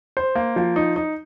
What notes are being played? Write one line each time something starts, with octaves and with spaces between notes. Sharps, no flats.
C5
A#3
F3
D#4
D#4